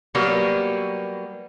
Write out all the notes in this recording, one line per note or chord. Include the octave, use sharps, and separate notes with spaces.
F#3 G3 A#3 B3